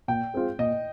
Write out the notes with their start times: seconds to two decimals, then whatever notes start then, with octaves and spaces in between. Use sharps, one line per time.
0.08 A#2 G5
0.34 G#3 C4 F4
0.59 A#2 D#5